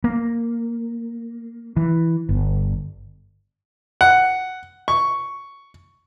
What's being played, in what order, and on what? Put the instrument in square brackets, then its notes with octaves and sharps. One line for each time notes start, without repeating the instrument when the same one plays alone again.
[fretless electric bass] A#3
E3
G1
[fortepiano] F#5
C#6